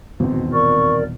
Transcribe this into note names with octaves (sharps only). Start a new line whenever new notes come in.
D#1 G#1 E2 B2 C4
A#4 D5 C#6